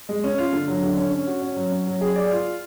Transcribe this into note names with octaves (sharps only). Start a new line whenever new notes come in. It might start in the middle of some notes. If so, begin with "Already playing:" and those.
G#3
C#4
F4
D3
F#3
D3
C#4
C#4
F#4
C#4
F#3
C#4
F#3
G#4
D5
F4